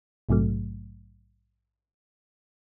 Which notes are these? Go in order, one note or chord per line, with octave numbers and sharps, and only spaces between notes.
A#1 G#2 C3 F#3 A3